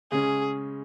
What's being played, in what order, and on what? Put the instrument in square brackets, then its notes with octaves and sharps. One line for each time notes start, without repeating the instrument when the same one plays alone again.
[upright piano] C#3 G#3 C#4 [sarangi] G#4